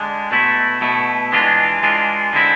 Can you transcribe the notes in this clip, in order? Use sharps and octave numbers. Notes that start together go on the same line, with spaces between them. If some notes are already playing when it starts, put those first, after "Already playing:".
Already playing: D3 G#3 D4
B2 A3 E4
B2 A3 E4
E3 G#3 D4 F4
E3 G#3 D4 F4
D3 G#3 C4 E4